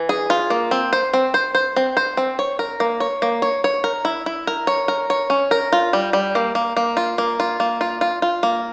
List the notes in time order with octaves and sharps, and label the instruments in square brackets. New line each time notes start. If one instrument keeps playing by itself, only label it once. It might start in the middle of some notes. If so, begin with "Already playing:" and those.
Already playing: [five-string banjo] E3
G#4
F4
A#3
C4
C5
C4
C5
C5
C4
C5
C4
C#5
A#4
A#3
C#5
A#3
C#5
C#5
A#4
E4
E4
A#4
C#5
A#4
C#5
C#4
A#4
F4
G3
G3
A#3
A#3
A#3
F4
A#3
F4
A#3
F4
F4
F4
A#3